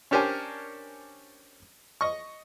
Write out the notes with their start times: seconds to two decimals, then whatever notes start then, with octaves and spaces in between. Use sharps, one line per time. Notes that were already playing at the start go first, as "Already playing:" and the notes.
0.11 C#4 D4 G4 A#4 C5 G#5
2.01 D#5 C#6